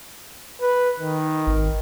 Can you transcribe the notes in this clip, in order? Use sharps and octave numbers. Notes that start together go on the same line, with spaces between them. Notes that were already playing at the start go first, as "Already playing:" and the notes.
B4
D#3
G#1